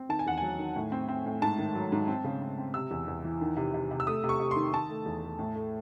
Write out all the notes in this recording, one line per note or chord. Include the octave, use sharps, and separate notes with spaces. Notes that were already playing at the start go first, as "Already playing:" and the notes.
Already playing: C4
D#3 A5
G#5
E2 F#5
F#3 G#5
D#3
A2
C4
C4
A2
G#2 A5
D#3
F#3
G#2
C4
C#3
C4
C4
C3 E6
E2
E2
E3
D#3
C3
C3
C3
E6
A3 D#6
C3
C#6
C3
D#3 C6
D#3 A5
A3
E2
A3
A2
A3